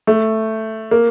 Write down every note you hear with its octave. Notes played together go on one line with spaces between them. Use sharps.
A3
A#3